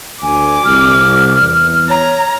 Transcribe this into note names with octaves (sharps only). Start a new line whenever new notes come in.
D2 G#5 D6
C2 F6
E2
C#5 A#5